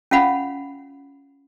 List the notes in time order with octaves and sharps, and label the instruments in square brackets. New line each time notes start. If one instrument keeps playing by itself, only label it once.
[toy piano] C#4 F4 F5 F#5 B5